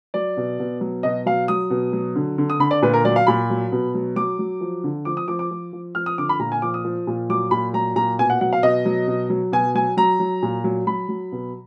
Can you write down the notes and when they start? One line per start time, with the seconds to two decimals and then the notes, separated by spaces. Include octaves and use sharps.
0.14 F#3 D5
0.37 B2
0.59 B2
0.81 F#3
1.03 B2 D#5
1.26 F#3 F5
1.48 F#3 D#6
1.70 B2
1.93 F#3
2.15 D3
2.38 D3
2.50 D#6
2.60 D3 B5
2.71 D5
2.82 A#2 B4
2.93 A#4
3.05 F#3 D5
3.16 F5
3.27 A#2 B5
3.50 F#3
3.72 B2
3.95 F#3
4.16 F#3 D6
4.39 F#3
4.61 F3
4.84 D3
5.05 F3 D6
5.17 D#6
5.28 F3 D6
5.39 D6
5.51 F3
5.73 F3
5.95 F3 F6
6.06 D#6
6.18 D3 D6
6.29 B5
6.39 A#2 A#5
6.52 G#5
6.62 F3 D6
6.74 D#6
6.85 F3
7.07 A#2
7.29 F#3 D6
7.51 A#2 B5
7.73 F#3 A#5
7.96 A#2 A#5
8.19 B2 G#5
8.30 F#5
8.41 F#3 F#5
8.53 F5
8.63 B2 D#5
8.85 F#3
9.07 B2
9.30 F#3
9.52 B2 G#5
9.75 F#3 G#5
9.97 F#3 A#5
10.20 F#3
10.43 A#2
10.64 F#3
10.87 F#3 B5
11.09 F#3
11.32 B2